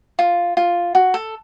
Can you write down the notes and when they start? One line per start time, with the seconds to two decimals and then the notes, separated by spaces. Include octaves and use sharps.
0.19 F4
0.57 F4
0.95 F#4
1.14 A4